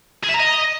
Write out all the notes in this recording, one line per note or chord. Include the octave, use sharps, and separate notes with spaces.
G#4
E5
A#5
D#5